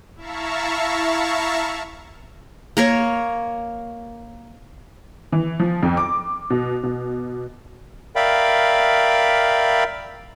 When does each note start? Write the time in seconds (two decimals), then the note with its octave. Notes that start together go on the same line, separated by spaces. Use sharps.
0.16 E4 E5 F5 A5 A#5 C#6
2.77 A#3 A#4 C#5
5.32 E3
5.60 F3
5.83 F2
5.97 D6
6.50 B2
6.83 B2
8.16 A#4 D5 E5 F5 G5 B5